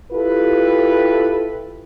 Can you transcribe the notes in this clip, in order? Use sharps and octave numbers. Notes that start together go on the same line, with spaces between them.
E4 F4 G4 A4 B4